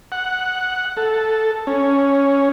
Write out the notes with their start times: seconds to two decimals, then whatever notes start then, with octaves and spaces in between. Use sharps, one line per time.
0.12 F#5
0.97 A4
1.67 C#4